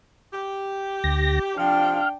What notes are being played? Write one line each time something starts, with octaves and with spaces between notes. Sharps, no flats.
G4
D2 A#6
C3 F3 D4 F5 G5